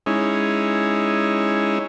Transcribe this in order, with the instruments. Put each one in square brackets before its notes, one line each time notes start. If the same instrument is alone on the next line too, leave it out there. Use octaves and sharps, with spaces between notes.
[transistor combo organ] G#3 C#4 D#4 E4